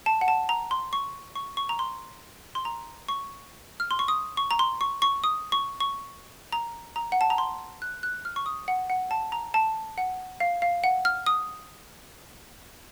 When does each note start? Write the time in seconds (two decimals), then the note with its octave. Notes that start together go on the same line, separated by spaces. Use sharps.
0.06 A5
0.21 F#5
0.28 A5
0.49 A#5
0.71 C6
0.93 C#6
1.35 C#6
1.57 C#6
1.69 A#5
1.79 C6
2.55 C6
2.65 A#5
3.08 C#6
3.80 F6
3.91 C6
3.99 C#6
4.08 D#6
4.37 C#6
4.51 A#5
4.59 C6
4.81 C#6
5.02 C#6
5.24 D#6
5.52 C#6
5.80 C#6
6.52 A#5
6.96 A#5
7.12 F#5
7.21 A5
7.30 A#5
7.38 C6
7.82 F#6
8.03 F#6
8.25 F6
8.36 C#6
8.46 D#6
8.68 F#5
8.90 F#5
9.11 A5
9.32 A#5
9.54 A5
9.98 F#5
10.40 F5
10.62 F5
10.84 F#5
11.05 F6
11.26 D#6